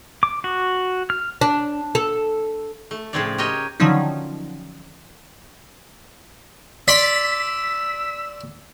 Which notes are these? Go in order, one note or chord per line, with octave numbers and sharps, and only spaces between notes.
D6
F#4
F6
D4
A4
A3
A2 C#3 F3 C4 C#5 D5
G4 A#4 C#5 D#5 G5
D3 D#3 F3 F#3 C#4 D#4
D5 C6 E6 B6